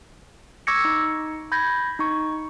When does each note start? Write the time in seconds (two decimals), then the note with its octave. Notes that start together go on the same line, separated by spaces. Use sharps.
0.67 C#6 D6 E6 G#6 A#6 C#7
0.85 D#4
1.52 B5 G6 G#6 A#6
1.99 D#4 C#6